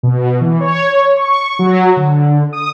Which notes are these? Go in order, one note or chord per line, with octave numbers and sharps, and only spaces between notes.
B2
E3
C#5
C#6
F#3
D3
D#6